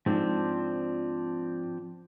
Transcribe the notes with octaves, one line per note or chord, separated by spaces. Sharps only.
G#2 F3 C4 D4